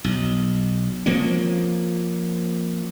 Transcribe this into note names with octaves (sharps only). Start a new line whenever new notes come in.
B1
F3 A#3 C4 C#4